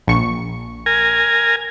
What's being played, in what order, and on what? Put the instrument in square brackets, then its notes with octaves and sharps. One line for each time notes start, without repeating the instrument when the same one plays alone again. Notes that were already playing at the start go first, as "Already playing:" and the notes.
[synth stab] A#1 C#6
[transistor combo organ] A#4 G#5